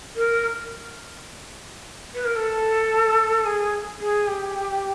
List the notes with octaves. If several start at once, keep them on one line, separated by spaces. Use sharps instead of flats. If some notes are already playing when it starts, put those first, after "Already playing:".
A#4
B4
A#4
A4
G#4
G#4
G4